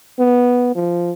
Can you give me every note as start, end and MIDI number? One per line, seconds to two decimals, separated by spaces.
0.19 0.73 59
0.75 1.12 53